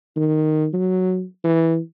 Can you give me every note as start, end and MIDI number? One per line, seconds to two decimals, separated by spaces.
0.17 0.68 51
0.73 1.24 54
1.44 1.79 52